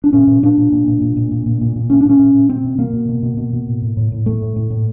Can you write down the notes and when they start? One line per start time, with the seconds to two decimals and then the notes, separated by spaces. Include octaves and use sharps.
0.04 D4
0.13 A#2 C#4
0.27 A#2
0.43 A#2 D4
0.58 A#2
0.72 A#2
0.88 A#2
1.01 A#2
1.17 A#2
1.32 A#2
1.46 A#2
1.61 A#2
1.76 A#2
1.90 A#2 C#4
2.01 D4
2.05 A#2 C#4
2.19 A#2
2.34 A#2
2.49 B2 C4
2.64 B2
2.78 B2 A#3
2.93 B2
3.09 B2
3.23 B2
3.37 B2
3.53 B2
3.67 A2
3.82 A2
3.97 A2
4.12 A2
4.26 A2 A3
4.42 A2
4.56 A2
4.70 A2